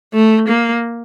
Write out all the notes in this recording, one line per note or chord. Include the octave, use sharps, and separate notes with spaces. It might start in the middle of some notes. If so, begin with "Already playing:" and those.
A3
A#3